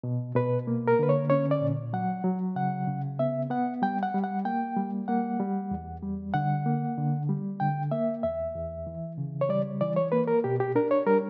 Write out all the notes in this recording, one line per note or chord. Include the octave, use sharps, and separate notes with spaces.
B2
B2 B4
A#3
A#4
D3 B4
C#5
C#4 C#5
D5
A#2
F#3 F#5
F#3
C#3 F#5
C#3
B3 E5
B3 F#5
G3 G5
F#5
G3
F#5
A#3 G5
G3
A#3 F#5
G3
E2
G3
D3 F#5
A#3
D3
G3
D3 G5
A#3 E5
E2 E5
E2
E3
C#3
C#5
G3 D5
E3 D5
C#5
A#3 B4
A#4
B2 G4
G4
D4 A#4
C#5
G3 A#4